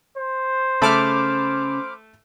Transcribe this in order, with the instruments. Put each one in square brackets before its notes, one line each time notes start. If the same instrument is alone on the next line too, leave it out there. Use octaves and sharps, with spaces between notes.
[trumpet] C5
[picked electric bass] C#3 [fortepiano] A3 E5 A5 [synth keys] B5 D6 F6